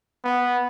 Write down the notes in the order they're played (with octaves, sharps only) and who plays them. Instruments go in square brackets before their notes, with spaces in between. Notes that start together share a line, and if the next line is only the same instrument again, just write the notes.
[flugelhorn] B3